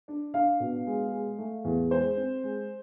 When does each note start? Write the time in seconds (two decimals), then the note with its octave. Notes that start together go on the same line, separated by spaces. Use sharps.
0.08 D4
0.34 D4 F5
0.60 B2
0.87 G#3
1.12 G#3
1.38 A3
1.65 E2
1.90 G#3 C5
2.17 C4
2.44 G#3